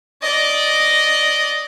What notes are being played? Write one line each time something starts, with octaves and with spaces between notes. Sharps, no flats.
D5 D#5